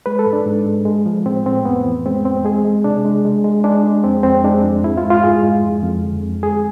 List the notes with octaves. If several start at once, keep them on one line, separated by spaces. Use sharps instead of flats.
G#3 B4
A4
G#2
D4
G#2
G#3
G#3
F3
A2 C4
A2 C4
F2 B3
E3
G#3 C4
F2 C4
G#3 G#4
G#3
C3 D4
G#3
G#3
G#3
G#3 D4
G#3
F2 C4
F2 C4
G#3 D4
F2
G#2 E4
F4
G#3
F4
G#2 G#4
G#3
F2
F2
D3
F2
G#3 G#4